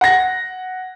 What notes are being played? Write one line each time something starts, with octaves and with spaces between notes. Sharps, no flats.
F#5 A#6